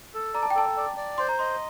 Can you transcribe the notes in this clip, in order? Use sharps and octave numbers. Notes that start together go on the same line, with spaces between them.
A4
D5 A#5
A5
G5
A4 A5
D5
D5
C5 C6
A#5
D#5 C6